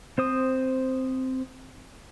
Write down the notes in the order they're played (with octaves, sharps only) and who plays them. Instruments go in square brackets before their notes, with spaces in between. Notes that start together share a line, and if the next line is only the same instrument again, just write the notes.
[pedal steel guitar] C4 C5 D#6